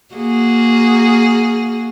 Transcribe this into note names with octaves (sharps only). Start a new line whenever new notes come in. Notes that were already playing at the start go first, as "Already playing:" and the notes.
A#3 F#4 G#4